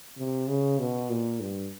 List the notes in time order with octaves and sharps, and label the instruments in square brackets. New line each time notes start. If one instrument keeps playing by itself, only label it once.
[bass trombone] C3
C#3
B2
A#2
G2